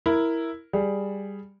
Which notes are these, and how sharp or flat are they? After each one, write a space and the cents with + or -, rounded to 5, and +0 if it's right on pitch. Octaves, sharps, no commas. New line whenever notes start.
E4 +0 A#4 +0
G3 +10 G#4 +0